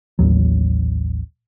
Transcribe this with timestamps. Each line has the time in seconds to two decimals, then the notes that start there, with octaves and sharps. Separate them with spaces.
0.19 A1 D#2 F#3